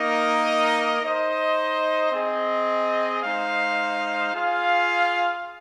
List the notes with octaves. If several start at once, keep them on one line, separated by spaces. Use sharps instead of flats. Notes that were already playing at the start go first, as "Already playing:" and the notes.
Already playing: A#3 D#4 A#4 D#5
D#4 C5 D#5
C4 G#4 D#5
G#3 D#4 C5 F5
F4 G#4 F5